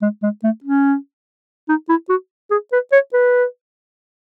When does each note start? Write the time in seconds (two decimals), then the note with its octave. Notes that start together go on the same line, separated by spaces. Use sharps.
0.02 G#3
0.23 G#3
0.44 A3
0.64 C#4
1.69 D#4
1.89 E4
2.09 F#4
2.51 G#4
2.72 B4
2.92 C#5
3.13 B4